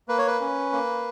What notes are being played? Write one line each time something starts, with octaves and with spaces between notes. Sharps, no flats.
A#3 B4
C#5
B4
C#4
A#3